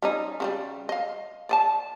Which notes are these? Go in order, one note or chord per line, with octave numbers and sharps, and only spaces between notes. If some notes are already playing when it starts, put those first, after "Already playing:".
G3 C#4 D#4
C#3 F#3 G3
D#5 F5
D5 D#5 A5